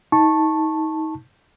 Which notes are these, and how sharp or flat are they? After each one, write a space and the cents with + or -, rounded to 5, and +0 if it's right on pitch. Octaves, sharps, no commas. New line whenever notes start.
D#4 +30 A5 +0 C#6 -15